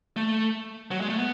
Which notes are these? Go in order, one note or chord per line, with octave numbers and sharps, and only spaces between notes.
A3
F#3
G#3
A3
B3